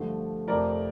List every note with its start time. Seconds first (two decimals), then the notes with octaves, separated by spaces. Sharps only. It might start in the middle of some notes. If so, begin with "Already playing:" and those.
Already playing: G2 D3 F3 A3
0.48 F2 C3 F3 A3 A#4 D5